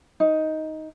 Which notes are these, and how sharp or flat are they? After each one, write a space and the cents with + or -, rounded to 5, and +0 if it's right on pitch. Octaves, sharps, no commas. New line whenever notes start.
D#4 +10